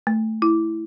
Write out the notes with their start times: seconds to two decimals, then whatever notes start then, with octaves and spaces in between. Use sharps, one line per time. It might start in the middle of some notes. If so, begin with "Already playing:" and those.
0.07 A3
0.42 E4